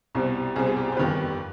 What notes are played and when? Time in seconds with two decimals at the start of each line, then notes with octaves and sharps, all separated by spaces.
0.15 C2 B2 G3 C4
0.56 C2 B2 G3 C4 G#4
0.66 G#4
0.76 G4
0.87 G#4
0.92 C5
0.97 G1 F2 D#3 G3 B3 B4